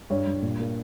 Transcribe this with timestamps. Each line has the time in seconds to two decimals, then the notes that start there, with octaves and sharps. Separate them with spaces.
0.10 G2 C#5
0.27 G2
0.42 A#2
0.59 A#3